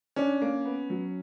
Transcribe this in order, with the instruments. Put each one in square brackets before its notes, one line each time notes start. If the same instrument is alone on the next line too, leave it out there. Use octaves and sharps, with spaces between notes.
[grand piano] C#4 [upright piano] D4
[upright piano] A#3
B3
F#3